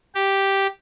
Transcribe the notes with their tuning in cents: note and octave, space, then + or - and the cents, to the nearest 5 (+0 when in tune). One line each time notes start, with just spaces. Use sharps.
G4 -5